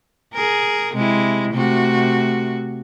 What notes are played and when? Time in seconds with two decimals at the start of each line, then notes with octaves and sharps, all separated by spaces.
0.34 G#4 A#4
0.94 C3 G#3 E4
1.53 C3 A3 F#4